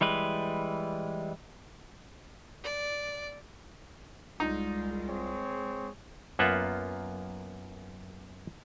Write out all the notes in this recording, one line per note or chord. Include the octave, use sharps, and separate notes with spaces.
E3 G3 G#3 B4
D5
C2 G#3 D#4 F4
C4 G#4 C#5
F#2 A#3 B3 F4 E5 F#5